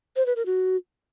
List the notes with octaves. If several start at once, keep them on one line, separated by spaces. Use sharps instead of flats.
C5
B4
A#4
F#4